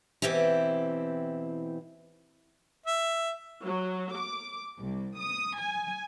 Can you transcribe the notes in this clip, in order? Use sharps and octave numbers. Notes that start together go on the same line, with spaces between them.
B2 E3 C4 E4 G4
E5
F#3
D6
C2
D#6
G#5